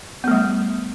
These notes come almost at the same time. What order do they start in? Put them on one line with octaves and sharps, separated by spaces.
B3 A3 G3